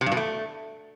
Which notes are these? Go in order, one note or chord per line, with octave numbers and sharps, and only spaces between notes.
C3
G2
B2
A3